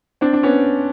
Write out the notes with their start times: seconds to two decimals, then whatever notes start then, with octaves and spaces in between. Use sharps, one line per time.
0.21 C4 D4
0.33 D4
0.43 B3 C#4